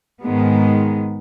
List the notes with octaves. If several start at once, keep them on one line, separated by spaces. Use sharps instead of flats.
G#2 D#3 G#3 B3